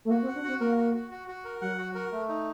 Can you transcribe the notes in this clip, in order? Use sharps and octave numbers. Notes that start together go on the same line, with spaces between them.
A3
A#3 F#4
C4
F#5
D4
C4 F#4
A#3 A#4
F#4
F#4
F#4
F#4
A#4
F#3 F#5
F#4
A#4
A3
D#4